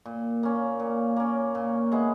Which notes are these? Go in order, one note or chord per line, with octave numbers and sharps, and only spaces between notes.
A#2
A#3 C#4
A#2
A#3 C#4
A#2
G#3 B3 E4